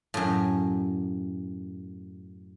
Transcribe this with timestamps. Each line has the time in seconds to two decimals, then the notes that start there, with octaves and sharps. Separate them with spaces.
0.14 F#2 A2